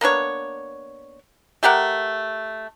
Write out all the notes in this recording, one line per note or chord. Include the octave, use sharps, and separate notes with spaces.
A#3 B3 D4 C#5
A3 G4 A#4 F#5